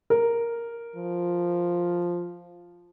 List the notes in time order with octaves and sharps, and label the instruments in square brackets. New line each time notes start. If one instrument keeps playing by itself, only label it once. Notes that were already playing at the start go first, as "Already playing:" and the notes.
[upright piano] A#4
[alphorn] F3